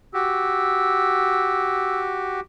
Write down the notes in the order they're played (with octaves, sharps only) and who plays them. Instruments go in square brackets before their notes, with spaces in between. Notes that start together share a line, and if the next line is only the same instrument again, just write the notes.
[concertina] F#4 G4 [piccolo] E6